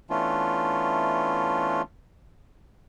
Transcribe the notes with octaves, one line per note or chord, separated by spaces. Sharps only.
E3 A3 B3 C#4 D4 F4